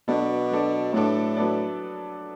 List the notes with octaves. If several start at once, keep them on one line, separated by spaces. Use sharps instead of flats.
B2 F#3 B3 D4 A4 D5
F#3 B3 D4 A4 D5
A2 F#3 B3 D4 A4 D5
F#3 B3 D4 A4 D5